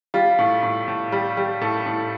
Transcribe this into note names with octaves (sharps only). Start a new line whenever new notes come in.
G3 F4
A2
A2
A2
G3
G3
A2 A4
A2